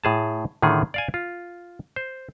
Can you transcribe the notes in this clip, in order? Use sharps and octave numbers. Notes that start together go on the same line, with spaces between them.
A2 G#4 A5
A2 D3 D#3 G#4
D5 F5 G#5
F4
C5